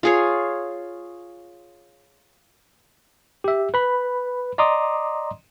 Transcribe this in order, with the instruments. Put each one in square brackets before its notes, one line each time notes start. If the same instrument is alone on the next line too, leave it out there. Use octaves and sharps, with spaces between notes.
[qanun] F4 G#4 C#5
[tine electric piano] G4 E5
B4 B5
D5 D#5 A#5 C6 D6 D#6